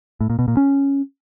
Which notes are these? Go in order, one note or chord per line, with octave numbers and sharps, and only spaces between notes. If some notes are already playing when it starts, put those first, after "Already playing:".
A2
A#2
B2
A#2
C#4